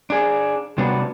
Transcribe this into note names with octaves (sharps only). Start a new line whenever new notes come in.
D4 G#4
C3 G3 B3 D4 F#4 B4